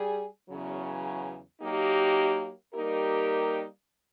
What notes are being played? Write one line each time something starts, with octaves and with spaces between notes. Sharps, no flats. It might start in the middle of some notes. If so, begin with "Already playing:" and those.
Already playing: G3 G#4
E2 C#3 F#3
F#3 A#3 D#4 G4
G3 A#3 D#4 G4 A#4